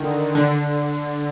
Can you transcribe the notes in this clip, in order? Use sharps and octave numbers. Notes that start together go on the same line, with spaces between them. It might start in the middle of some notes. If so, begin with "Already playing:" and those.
Already playing: D3 D#3
D3